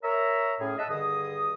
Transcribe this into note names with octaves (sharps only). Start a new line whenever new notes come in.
A#4 C#5 E5 A#5
A2 C#4 G#4
D#5 E5 F#5 A5
G2 D3 D#3 G#4 D#5 D#6